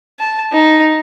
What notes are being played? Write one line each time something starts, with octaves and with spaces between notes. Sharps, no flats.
A5
D#4